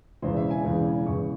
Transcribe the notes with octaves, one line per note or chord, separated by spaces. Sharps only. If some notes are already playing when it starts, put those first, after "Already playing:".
E1 E2 C#3 E3 C5
E5
G#5
E1 E2 C#3 E3
E1 E2 C#3 E3 C#6